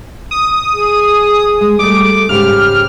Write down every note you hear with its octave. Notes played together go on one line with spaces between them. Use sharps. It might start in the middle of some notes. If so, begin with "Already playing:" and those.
D#6
G#4
G#3
G3 A3 D6
G#2 C#3 G4 F6